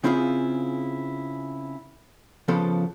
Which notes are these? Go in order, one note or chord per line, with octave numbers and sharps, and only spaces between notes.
C#3 C4 E4 F4 G4 G#4
C#3 F3 B3 A4